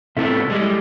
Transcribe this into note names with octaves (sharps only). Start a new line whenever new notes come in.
C3 A3 B3 E4 A4 E5
G3 G#3